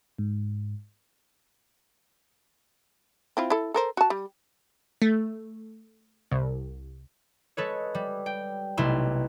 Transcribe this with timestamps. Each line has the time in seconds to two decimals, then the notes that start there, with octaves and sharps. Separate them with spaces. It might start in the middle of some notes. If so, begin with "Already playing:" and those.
0.18 G#2
3.37 C4 E4 F4
3.50 E4 A4
3.74 A4 A#4 C5
3.97 F#4 A5
4.10 G3
5.02 A3
6.31 C2
7.57 G#3 A4 B4 C#5
7.95 G3
8.26 G5
8.77 B1 C3 A3 E4 C6